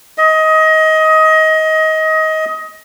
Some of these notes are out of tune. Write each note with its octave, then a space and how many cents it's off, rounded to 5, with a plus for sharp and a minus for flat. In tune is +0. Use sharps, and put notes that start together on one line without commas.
D#5 +20